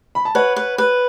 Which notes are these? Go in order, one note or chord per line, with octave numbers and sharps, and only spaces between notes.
B5
A5
B4 C#5 F#5
B4
B4